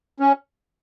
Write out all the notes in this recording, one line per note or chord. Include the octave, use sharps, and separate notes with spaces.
C#4